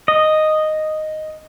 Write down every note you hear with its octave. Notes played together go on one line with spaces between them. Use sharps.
D#5